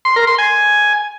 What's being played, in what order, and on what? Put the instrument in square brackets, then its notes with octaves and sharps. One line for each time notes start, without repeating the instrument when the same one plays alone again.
[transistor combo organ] C6
A#4
C6
G#5